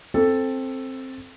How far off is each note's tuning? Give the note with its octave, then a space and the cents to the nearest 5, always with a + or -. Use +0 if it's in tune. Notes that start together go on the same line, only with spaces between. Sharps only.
C4 +10 A4 +0